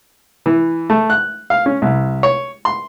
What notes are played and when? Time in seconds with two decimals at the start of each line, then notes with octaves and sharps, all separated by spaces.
0.46 E3
0.90 A3
1.10 F#6
1.50 F5
1.66 C#4
1.82 C2
2.23 C#5
2.65 C6